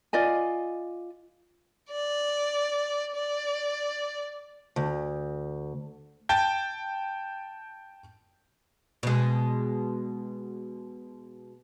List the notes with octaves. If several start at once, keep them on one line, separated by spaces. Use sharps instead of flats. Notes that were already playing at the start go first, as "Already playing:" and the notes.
F4 D5 D#5 G#5
D5
D5
D2
G5 A5 G6
B2 G#3